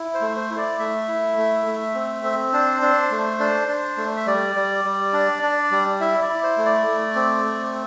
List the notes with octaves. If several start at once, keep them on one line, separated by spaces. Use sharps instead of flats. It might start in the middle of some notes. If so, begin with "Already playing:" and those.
Already playing: E4
C5
A3
C5
E4
D5
A3 E5
E4
A3
A3
C4
C4
D4 C5
D4
A3
D4
D4
A3
E5
G3 D5
G3
G3
D4
D4
G3
E4 E5
D5
E4
C5
A3
D5
A3
C4
A3